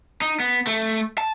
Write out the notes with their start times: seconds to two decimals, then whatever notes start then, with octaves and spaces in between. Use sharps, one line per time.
0.22 D#4
0.40 B3
0.67 A3
1.18 A5